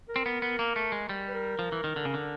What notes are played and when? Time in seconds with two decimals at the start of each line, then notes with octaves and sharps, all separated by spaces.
0.09 A#4
0.16 C4
0.26 B3
0.42 B3
0.59 A#3
0.76 A3
0.92 G#3
1.09 G3
1.29 B4
1.34 A#4
1.59 F3
1.72 E3
1.84 D#3
1.96 D3
2.05 C#3
2.14 D3